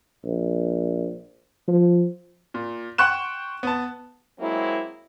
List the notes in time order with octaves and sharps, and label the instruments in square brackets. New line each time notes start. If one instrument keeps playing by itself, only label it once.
[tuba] A#1
F3
[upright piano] A#2
F#5 G5 C6 C#6 F#6 E7
B3 A5
[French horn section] F#3 G#3 A#3 C4 E4